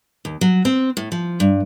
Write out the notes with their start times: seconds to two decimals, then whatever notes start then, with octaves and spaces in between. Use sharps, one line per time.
0.25 D#2
0.41 F#3
0.65 C4
0.97 A2
1.12 F3
1.40 G2